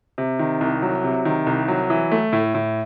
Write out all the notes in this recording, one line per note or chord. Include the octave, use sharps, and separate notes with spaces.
C3
D#3
C2
F#3
C3
D#3
C2
F#3
E3
A3
A2
A2